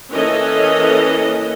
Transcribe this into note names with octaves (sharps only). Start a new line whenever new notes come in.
E3 A#3 C#4 A4 D#5